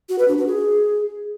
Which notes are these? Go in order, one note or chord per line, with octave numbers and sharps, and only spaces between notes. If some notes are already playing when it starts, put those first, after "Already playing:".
F#4
B4
D4
F#4
G#4